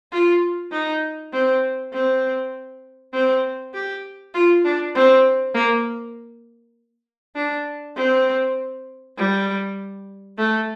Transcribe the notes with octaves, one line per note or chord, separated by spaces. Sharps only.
F4
D#4
C4
C4
C4
G4
F4
D4
C4
A#3
D4
C4
G3
A3